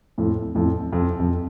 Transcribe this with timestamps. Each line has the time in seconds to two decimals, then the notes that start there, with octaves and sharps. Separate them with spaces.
0.18 F2 A2
0.55 F2 A2
0.93 F2
1.19 F2